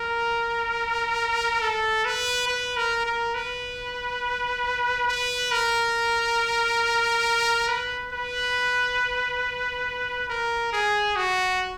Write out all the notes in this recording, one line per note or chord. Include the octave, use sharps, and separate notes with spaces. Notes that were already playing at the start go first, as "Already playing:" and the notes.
Already playing: A#4
A4
B4
B4
A#4
A#4
B4
B4
A#4
B4
B4
A#4
G#4
F#4